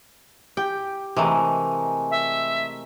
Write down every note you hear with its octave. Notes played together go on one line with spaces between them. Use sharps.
G4 G5
C3 E3 G#3 A3 A#4
E5